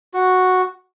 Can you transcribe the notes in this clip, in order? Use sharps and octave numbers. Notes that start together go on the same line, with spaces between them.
F#4